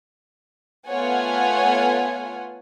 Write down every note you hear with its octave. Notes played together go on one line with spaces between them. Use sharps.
A3 B3 F4 C#5 F#5 G#5